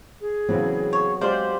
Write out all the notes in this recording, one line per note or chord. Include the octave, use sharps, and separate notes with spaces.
G#4
C#2 A2 E3 F#3 B3 C4
C#5
G#3 G4 C5 D5 F5